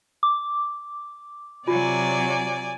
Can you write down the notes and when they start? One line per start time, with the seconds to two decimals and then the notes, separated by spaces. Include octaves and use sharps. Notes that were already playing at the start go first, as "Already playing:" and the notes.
0.23 D6
1.67 C3 F#3 F4 D5 G#5